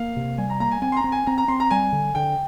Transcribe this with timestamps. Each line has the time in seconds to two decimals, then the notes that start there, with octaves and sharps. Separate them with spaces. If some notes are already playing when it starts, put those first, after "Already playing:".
Already playing: A#3 F5
0.17 C3
0.38 G3 G#5
0.50 A#5
0.60 A#3 A#5
0.71 G#5
0.82 C4 G#5
0.92 C6
0.97 A#5
1.04 C4
1.12 G#5
1.27 C4 A#5
1.38 A#5
1.48 C4 C6
1.60 A#5
1.71 G3 G#5
1.92 D3
2.15 D3 G5